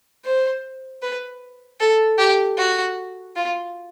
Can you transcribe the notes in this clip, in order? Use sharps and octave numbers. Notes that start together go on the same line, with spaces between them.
C5
B4
A4
G4
F#4
F4